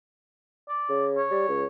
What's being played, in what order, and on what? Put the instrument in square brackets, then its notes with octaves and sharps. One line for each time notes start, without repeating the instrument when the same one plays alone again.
[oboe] D5
[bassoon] C#3
[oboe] C#5
[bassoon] G3
C#2